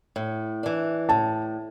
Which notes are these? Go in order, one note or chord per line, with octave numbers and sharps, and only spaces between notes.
A2
E3 D4
A2 A5